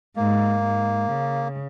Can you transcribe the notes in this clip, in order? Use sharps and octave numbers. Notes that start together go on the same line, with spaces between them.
G#2 A#3
G#2
C#3